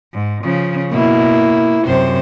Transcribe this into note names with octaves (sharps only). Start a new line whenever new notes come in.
G#2
C#3 F3
B2 A#3 E4
F#2 C3 C5